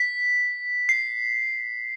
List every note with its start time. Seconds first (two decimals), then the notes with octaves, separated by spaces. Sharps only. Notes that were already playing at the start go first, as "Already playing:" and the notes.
Already playing: B6
0.89 C7